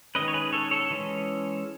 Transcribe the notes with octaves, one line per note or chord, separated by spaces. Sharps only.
D#3 G#3 C#4 B4 D#5
C#5
G#4 B4
A4 C#5
A4 C#5
E3 G#3 C#4